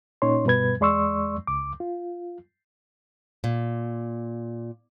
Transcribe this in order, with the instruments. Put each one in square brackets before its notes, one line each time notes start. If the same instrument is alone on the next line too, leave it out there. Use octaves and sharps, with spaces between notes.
[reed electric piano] A#2 C#4 D#4 C#5 C6
G2 B2 G3 B4 G#6
E2 G#3 D5 C6 C#6 E6
C#2 D6
F4
[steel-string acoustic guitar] A#2